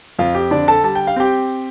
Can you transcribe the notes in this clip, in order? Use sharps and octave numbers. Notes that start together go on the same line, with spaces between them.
F2 F4
G4
D3 D4 D5
A4 A5
G3 A5
G5
F5
C4 G4 G5